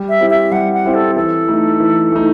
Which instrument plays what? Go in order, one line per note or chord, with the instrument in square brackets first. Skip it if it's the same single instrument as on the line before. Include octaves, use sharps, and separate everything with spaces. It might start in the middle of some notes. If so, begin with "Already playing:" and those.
Already playing: [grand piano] G3
[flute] E5
[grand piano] C4 E4 G4
[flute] E5
[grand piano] G3 [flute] F#5
[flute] F#5
[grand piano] C4 E4 G4
[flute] A4
[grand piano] E3 [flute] A4
[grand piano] A3 D#4
E3
A3 D#4